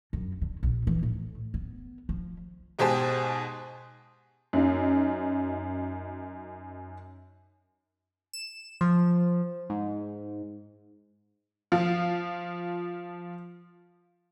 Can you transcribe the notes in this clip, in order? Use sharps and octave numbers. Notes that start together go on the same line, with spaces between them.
F#2
D3
A#1
E3
A2
B3
F3
G#2 B2 G4 G#4 C5 A5
F#2 D#4
E7
F3
G#2
F3 F4